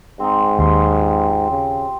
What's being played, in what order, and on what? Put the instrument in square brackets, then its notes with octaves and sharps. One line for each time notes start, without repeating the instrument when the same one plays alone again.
[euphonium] G#2 [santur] C4 D#4
[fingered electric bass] D#2 [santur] G4 E5 C6
[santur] F4
[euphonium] C#3